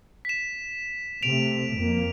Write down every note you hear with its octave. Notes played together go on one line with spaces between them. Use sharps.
B6 E7
C3 A3 D7 F7
F2 A#3